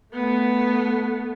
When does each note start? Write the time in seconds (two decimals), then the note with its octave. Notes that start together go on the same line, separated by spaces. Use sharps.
0.13 A3 B3